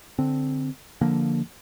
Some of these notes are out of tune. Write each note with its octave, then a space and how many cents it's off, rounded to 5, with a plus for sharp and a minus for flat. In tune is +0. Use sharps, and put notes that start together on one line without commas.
D3 +0 C4 +0
D3 +0 F3 -5 A#3 +0